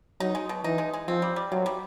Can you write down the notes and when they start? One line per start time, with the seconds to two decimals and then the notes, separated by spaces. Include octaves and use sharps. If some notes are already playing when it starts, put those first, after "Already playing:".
0.20 F#3 D#4
0.35 G#3
0.49 B2
0.64 E3 D#4
0.78 G#3
0.93 G#3
1.08 F3 C4
1.22 G3
1.36 G3
1.52 C3 F#3
1.66 G3